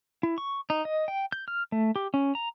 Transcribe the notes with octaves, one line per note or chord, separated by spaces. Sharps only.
E4
C#6
D#4
D#5
G5
G6
F6
A3
G4
C#4
A#5